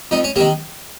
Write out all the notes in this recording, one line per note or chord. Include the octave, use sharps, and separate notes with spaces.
F2 D#4
C#4
C3 D#3 A#3